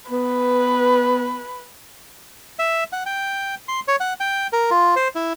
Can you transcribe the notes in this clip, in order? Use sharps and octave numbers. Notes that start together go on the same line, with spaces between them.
B3 B4
E5
F#5
G5
C6
C#5
F#5
G5
A#4
F4
C5
E4